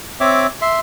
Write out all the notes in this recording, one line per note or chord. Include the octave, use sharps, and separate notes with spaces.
C4 C#5 E5 D6
E5 C6